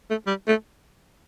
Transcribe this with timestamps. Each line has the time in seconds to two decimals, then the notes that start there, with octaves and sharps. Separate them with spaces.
0.10 A3
0.27 G3
0.48 A3